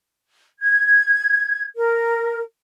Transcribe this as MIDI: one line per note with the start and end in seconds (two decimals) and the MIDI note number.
0.60 1.62 92
1.76 2.41 70